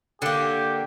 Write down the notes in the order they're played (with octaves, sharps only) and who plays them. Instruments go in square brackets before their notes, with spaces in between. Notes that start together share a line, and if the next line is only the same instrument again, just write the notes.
[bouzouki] D3 A#3 [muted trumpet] G4